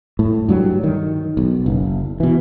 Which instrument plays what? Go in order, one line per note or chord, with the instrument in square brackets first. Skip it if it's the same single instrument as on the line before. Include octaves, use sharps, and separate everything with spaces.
[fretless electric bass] A2
G2 F#3 G3
D#3
B1
F#1
B2 E3